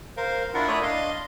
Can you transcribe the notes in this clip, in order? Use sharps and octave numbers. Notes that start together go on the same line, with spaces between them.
A#4 C5 F5
D4 E4 F4 A#4 F#5
A3 E4 C#5 D5 E5 D#6
D4 D#5 F5 C6